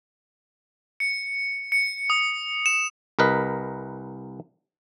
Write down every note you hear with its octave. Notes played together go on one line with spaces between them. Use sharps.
C#7
C#7
D#6
E7
C2 A#4 B4 D#5